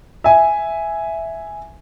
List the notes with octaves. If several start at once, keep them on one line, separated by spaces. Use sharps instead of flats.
E5 G#5